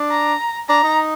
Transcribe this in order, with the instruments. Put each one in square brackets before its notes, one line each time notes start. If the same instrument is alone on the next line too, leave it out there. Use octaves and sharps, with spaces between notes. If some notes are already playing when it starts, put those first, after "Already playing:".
Already playing: [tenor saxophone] D4
[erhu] A#5
[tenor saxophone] D4 [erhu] A#5
[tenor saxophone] D#4